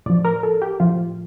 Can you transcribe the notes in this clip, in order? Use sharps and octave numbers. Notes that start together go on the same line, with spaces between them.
A2 F3 D5
A#4
A4
G4
A2 F3 F4